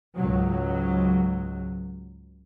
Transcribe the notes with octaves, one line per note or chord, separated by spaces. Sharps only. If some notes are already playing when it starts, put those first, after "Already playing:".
C#2 G#2 F#3